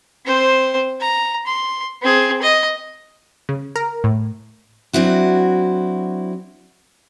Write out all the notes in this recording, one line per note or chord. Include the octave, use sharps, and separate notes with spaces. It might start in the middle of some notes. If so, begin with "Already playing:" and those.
C4 C5
A#5
C6
C4 G#4
D#5
C#3
A#4
A2
F#3 C4 D4 E4 F#4